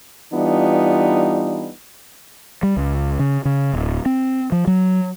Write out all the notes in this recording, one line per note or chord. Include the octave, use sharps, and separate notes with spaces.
E3 G3 B3 D4 D#4 F4
G3
C#2
C#3
C#3
D1
C4
F3
F#3